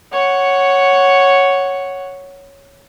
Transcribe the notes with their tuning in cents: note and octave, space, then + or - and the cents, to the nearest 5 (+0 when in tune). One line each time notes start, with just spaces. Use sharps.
C#5 +0 F#5 +0